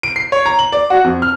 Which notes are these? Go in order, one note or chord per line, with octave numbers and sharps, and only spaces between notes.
D7
C7
C#5
A#5
F#7
D5
F#4
F2
F6